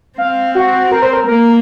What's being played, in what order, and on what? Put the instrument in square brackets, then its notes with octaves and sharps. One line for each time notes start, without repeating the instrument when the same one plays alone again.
[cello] C4 [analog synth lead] F5
[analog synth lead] F#4
A#4
C5
A#4
[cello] A#3 [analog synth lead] A#4